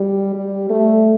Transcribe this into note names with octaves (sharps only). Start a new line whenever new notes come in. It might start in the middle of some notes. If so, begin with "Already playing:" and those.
Already playing: G3
G3
A3